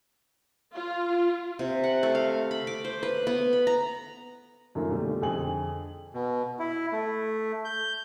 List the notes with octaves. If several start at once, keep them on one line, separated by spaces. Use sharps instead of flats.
F4
C3
F#5
A3
F5
B5
D6
C5
B4
B3
B5
A#5
F#2 D#3 F3 A3 A#3
B2 D3 G3 A3
F2 D3 G#4 G#5 F#7
B2
E4
A3
G6